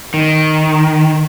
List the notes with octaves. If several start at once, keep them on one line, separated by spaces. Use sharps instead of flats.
D#3